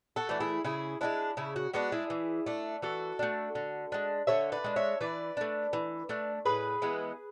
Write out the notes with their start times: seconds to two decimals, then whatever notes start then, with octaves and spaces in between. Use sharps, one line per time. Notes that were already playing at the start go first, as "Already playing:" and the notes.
0.16 F#4 A4
0.29 E3 A3 D4
0.40 E4 G#4
0.64 C#3 E4 G#4
1.01 G#3 B3 D4 E4
1.37 C#3 E4
1.56 F#4
1.73 G#3 B3 D4 F#4
1.92 E4 G#4
2.10 E3
2.46 A3 D4
2.82 E3 F#4 A4
3.19 A3 D4
3.55 D3
3.92 G#3 D4
4.27 D3 C#5 E5
4.52 B4 D5
4.64 G#3 D4
4.76 C#5 E5
5.01 E3 B4 D5
5.37 A3 D4
5.73 E3
6.09 A3 D4
6.46 A2 G#4 B4
6.82 E3 G#3 B3